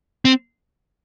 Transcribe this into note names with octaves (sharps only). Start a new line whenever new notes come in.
C4